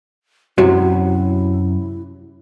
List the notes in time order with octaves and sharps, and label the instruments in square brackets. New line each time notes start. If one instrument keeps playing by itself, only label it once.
[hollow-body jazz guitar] F#2 C3 F#3 [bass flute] E4 [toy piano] F#4